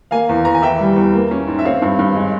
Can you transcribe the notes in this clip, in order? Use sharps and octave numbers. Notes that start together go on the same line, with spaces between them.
A#3 F5 G#5
E2
E2 A#5
G#5
E3 E5 G5
G3
E2
A#3
C#4
G#2
E5
C4 C#5 F5
G2
G2
G#3